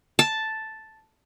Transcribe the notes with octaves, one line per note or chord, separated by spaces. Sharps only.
A5